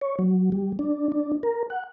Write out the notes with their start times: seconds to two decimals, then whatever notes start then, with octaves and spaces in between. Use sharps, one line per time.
0.01 C#5
0.19 F#3
0.52 G3
0.79 D4
1.12 D4
1.43 A#4
1.70 F#5